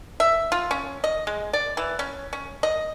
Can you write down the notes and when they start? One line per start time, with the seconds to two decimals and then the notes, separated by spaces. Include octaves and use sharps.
0.20 E5
0.52 F4
0.71 C#4
1.04 D#5
1.27 G#3
1.53 D5
1.77 E3
1.99 C#4
2.33 C#4
2.63 D#5